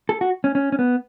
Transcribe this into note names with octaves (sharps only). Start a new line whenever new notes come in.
A4
F#4
C#4
C#4
C#4
B3